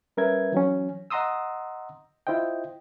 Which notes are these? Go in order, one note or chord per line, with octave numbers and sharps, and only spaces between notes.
G3 C#4 A#4 B4 E5 G#6
E3 F#3 C#4
D#5 F#5 A#5 C6 D#6 E6
E4 F4 C5 D#5 G5